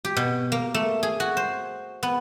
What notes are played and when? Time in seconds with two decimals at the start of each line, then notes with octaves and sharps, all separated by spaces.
0.05 G4
0.17 B2
0.52 A#3
0.74 A3
1.03 G#4
1.20 F#4
1.37 C5
2.03 B3